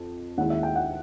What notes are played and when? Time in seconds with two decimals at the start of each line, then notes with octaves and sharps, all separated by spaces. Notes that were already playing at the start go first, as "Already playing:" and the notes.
Already playing: F2
0.38 D#2 D#3 G#3 C#4 E4 F#5
0.50 E5
0.63 G5
0.76 F#5